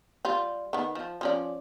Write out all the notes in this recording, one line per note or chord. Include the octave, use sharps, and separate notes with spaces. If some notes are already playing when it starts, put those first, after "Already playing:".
G3 F4
D#3 B3
F3
F3 C#4 D5